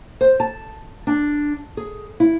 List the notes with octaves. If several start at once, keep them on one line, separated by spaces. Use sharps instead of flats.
C5
A5
D4
G#4
E4